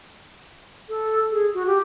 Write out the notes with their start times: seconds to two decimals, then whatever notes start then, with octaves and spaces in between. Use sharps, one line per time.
0.89 A4
1.31 G#4
1.54 F#4
1.67 G4